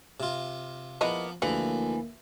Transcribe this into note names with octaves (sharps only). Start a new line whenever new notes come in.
C3 F4
F3 G#3 A#3 B3 E4 D#5
D2 E3 F3 A#3 G#4